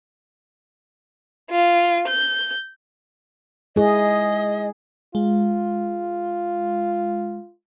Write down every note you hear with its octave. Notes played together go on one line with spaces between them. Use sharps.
F4
G6
G#3 E4 G#4 D#5
G#3 F4